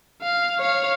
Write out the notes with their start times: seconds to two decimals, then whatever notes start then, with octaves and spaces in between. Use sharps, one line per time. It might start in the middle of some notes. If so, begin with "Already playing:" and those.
0.22 F5
0.59 C#5 F5